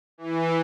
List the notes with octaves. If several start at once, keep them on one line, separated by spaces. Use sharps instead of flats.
E3